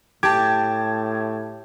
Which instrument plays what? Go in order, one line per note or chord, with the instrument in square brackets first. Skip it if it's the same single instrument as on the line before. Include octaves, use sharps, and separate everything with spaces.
[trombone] A2 [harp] G4 [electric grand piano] A5 D6 [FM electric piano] G#6